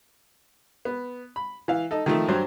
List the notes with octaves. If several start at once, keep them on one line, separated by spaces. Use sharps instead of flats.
B3
B5
E3 F5
D#4 A4
D#3 F3 A3
G2 F#3 C5